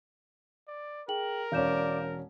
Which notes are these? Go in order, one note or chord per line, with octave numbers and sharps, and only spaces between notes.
D5
G#4 A#4 G5 F#7
E1 C#4 D5 F5 G6 E7